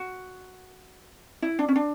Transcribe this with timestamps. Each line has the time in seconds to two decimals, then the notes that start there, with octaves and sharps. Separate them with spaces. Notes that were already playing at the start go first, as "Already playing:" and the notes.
Already playing: F#4
1.42 E4
1.59 D4
1.69 C#4
1.76 D4